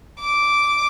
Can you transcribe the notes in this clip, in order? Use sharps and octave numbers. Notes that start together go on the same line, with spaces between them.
D6